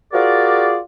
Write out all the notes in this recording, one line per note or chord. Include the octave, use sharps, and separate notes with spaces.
F4 F#4 G#4 A#4 D5